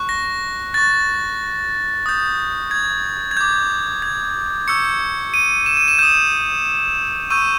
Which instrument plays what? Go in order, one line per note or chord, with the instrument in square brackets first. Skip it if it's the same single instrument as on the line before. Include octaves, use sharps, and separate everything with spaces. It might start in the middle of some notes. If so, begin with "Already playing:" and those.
Already playing: [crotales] C#6 F#6
A#6
C#6 F#6 A6
D#6 G6
G#6
G#6
D6 G6
G#6
C#6 E6 G6 C#7
D#7
E7
D#7
E7
D#6 G6 E7
C#6 E6 G6 D#7